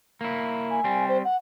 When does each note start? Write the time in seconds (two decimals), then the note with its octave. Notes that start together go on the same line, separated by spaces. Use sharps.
0.21 A#3 E4
0.71 G#5
0.84 G3 C4
1.08 C5
1.24 F#5